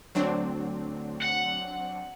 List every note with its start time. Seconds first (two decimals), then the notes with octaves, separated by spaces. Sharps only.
0.15 D2 F#3 C4 D4
1.22 F#5